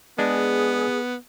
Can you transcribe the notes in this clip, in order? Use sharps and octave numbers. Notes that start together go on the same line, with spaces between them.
G#3 B3 D4 G#4